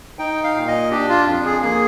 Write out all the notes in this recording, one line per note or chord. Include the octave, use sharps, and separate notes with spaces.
D#4 G5
F5
A#2
D#5
D4 G4
F4
F2
G#4
A#3 G#4